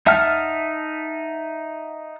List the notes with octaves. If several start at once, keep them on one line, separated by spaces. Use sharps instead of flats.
D#4 E5 F#5 A5 F6